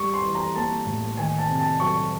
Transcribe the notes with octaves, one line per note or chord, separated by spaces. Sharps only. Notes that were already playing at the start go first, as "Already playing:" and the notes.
Already playing: G3 C#6
C6
E3
A#5
A#3 A5
A2
D#3 G#5
A5
C3
A5
F#3 C#6